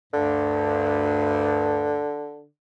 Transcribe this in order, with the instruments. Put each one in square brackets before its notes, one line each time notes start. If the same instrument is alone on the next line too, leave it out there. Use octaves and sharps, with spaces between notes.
[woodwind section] D2 G2 [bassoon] D3